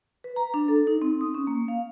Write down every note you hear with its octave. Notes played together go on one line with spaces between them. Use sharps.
B4
A#5
D4
A4
D#4
C4
D#6
C#4
A#3
F5